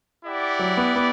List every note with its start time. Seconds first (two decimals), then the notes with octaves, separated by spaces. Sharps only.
0.24 E4 G4 D5 F#5
0.59 F#3
0.77 B3
0.96 B3